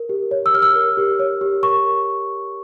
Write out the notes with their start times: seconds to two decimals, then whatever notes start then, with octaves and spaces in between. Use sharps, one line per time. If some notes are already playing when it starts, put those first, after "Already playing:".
Already playing: A#4
0.09 G4
0.31 C#5
0.46 E6
0.53 G4 F6
0.62 E6
0.75 A#4
0.97 G4
1.19 C#5
1.41 G4
1.63 A#4 C#6